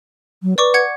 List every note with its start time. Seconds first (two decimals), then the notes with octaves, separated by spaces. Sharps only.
0.43 F#3
0.58 B4 D5 C#6 D6
0.74 F#5 G#6 C#7